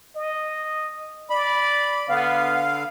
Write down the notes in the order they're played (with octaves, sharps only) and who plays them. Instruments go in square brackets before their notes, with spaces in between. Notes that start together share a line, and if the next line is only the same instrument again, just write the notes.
[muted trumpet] D#5
[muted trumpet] D5 [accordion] B5
[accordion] D3 F5 [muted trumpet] B3